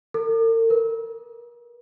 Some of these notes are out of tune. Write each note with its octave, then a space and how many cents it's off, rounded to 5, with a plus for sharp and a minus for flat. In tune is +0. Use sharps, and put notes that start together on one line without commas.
A#4 -45
A#4 +40